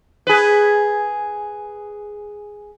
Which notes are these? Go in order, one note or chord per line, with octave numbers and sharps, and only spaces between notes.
G#4 B4